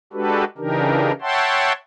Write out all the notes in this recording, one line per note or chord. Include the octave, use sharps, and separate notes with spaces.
G#3 D4 F#4 G4 A4 B4
C#3 E3 D4 D#4 G4 A#4
C#5 E5 F#5 G5 A5 C6